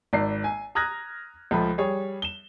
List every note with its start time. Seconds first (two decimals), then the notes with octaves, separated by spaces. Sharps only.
0.13 G#1 D5 C7
0.44 G#5
0.75 A#5 D#6 F6 F#6 G#6 A#6
1.51 C#2 F3 A3 B5
1.78 G3 G#4 C#5
2.22 E7 G7